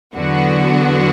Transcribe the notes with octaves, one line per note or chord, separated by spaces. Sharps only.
E2 D3 F#3 B3 F#4